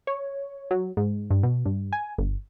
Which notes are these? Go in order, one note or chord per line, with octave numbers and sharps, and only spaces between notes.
C#5
F#3
G#2
G2
B2
G2
G#5
G1